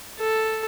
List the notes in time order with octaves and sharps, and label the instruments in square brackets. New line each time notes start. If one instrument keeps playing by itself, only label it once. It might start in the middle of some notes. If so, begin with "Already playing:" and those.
[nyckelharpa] A4